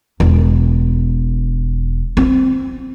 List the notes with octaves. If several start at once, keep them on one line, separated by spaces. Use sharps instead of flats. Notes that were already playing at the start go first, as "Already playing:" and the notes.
E1
C4